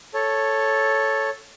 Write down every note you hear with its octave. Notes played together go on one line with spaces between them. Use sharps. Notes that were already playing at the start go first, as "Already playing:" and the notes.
A4 C#5